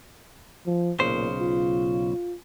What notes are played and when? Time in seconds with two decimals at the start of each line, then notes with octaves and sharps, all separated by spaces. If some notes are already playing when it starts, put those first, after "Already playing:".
0.66 F3
1.00 B1 A#2 C#3 C5
1.41 F4